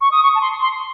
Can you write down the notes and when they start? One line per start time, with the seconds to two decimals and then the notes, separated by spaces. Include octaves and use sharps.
0.01 C#6
0.11 D#6
0.23 C#6
0.35 A5
0.41 C6
0.62 C6